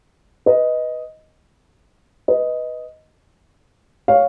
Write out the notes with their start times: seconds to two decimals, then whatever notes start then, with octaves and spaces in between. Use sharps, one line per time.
0.46 B4 D#5
2.28 B4 D#5
4.08 C#5 F5